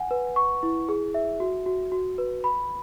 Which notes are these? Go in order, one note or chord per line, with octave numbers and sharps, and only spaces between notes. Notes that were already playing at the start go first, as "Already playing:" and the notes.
Already playing: F#5 G#5
B4
C#6
E4
G#4
E5
F#4
F#4
F#4
B4
B5